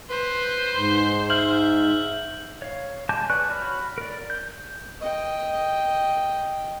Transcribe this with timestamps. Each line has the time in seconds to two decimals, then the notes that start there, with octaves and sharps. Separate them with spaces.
0.10 B4 C5
0.75 G#2
1.30 E5 F6 G6 F#7
2.62 C#5 F5
3.09 G#3 G#5 A5 D6 G6
3.30 B4 D5 G#5 C#6 F#6
3.50 F#4 C#5 B5 F6
3.98 A#4 D5
4.30 G6
5.01 D#5 G5